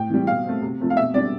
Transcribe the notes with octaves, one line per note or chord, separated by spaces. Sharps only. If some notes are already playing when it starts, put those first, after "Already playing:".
Already playing: A2 G5
E3 G3
B2 F5
A3 C4
C3
F3 A3 C4
F5
B2 E5
G3 D4 D5